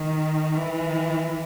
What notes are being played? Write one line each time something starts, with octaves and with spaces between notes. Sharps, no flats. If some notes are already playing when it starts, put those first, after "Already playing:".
Already playing: D#3
E3